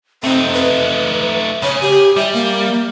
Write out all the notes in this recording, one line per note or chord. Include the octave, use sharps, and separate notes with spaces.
A3 C4 D#4
B4
C#3 C#5
G4 G#4
G3 E5
A#3